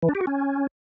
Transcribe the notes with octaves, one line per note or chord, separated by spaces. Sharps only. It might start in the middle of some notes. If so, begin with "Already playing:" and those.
E3
D4
G4
F#4
C#4